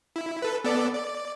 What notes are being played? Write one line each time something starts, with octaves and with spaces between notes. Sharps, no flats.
E4
A4 B4
B3 A4 D5
D5